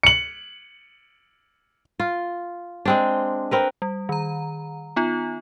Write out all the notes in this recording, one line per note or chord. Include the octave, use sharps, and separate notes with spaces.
C#7 F#7
F4
G#3 C4 D4
C4 A#4 B4
G3
D#3 A#5
B3 D#4 F4